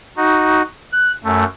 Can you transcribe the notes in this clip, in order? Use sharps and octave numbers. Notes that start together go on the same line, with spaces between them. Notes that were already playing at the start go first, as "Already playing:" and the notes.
D#4 F#4
F#6
F#2 A3